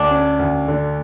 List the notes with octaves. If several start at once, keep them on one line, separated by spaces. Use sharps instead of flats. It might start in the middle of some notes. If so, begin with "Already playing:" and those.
Already playing: D2 D4
C#4
D2
D3